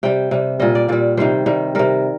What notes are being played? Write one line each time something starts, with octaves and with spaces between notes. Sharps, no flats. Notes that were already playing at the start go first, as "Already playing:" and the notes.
C3 G3 G5
C3 G3
A#2 G3 D#5
D5
A#2 G3 D5
C3 D#3 G3 C5
C3 D#3 G3
C3 G3 A#4